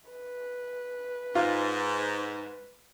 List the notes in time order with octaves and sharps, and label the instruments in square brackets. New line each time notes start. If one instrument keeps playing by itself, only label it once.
[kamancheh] B4
[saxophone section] G#2 [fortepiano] F4